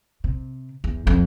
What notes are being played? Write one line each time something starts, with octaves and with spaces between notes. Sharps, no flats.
C3
E2
F2